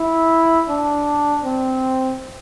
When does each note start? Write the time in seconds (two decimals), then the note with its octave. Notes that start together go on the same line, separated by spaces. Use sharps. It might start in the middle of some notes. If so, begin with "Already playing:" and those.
Already playing: E4
0.69 D4
1.44 C4